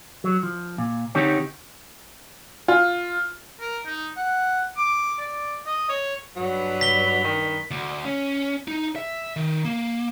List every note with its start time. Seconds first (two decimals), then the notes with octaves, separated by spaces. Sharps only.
0.24 F#3
0.43 F3
0.78 A#2
1.15 D3 C4 D#4 G4 C#5
2.68 F4
3.61 A#4
3.86 D#4
4.17 F#5
4.77 D6
5.19 D5
5.67 D#5
5.89 C#5
6.36 G2 F#3 D4 B4
6.81 B6 G7
7.24 D#3
7.71 D2
8.05 C#4
8.68 D#4
8.96 E5
9.36 D#3
9.65 A#3